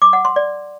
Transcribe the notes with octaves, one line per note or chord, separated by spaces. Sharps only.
D6
F#5
C6
D5